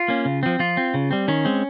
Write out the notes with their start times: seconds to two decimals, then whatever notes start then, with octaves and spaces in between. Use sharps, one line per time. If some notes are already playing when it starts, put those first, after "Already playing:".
Already playing: F4
0.08 A#3 C#4
0.25 C#3
0.43 F3 C4
0.59 F3 F4
0.77 C4
0.94 C#3
1.11 G3 C4
1.28 D#3 C#4
1.45 G#3 C4